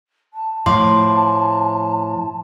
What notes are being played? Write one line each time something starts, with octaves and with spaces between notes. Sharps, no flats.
A5
A2 F3 F5 C6 D6